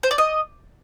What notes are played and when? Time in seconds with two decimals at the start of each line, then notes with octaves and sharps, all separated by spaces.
0.03 C5
0.11 D5
0.18 D#5